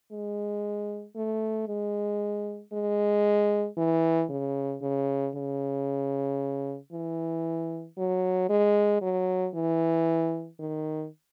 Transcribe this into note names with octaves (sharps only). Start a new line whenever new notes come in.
G#3
A3
G#3
G#3
E3
C#3
C#3
C#3
E3
F#3
G#3
F#3
E3
D#3